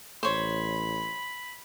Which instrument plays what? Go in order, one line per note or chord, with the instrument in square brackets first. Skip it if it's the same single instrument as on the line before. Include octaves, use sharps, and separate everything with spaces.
[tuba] A1 [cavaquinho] C5 C#5 [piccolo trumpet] B5